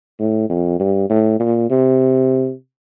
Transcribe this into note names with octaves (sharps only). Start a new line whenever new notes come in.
A2
F2
G2
A2
A#2
C3